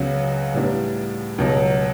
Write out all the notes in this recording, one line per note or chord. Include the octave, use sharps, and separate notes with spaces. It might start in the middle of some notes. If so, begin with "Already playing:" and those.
Already playing: C#2 C#3 F#3 B3 F#4
A2 G3 B3 D4
C#2 B2 F#3